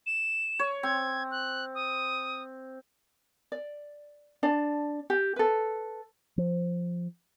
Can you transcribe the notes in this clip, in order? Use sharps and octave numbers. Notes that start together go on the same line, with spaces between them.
E7
C#5
C4 G#6
F#6
D#6
D5
D4 D5 A5
G4
A4 B4
F3